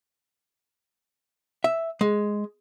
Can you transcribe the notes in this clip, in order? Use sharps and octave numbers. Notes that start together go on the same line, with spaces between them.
E5
G#3